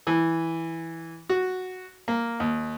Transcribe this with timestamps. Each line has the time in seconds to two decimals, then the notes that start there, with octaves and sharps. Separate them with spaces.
0.07 E3
1.29 F#4
2.08 A#3
2.40 D#2